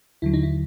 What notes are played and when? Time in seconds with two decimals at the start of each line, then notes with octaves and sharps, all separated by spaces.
0.22 D#2 D3 F#3 E4
0.34 D#4
0.43 E4